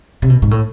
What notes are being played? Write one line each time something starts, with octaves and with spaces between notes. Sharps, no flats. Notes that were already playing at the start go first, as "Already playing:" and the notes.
C3
B2
G#2
A2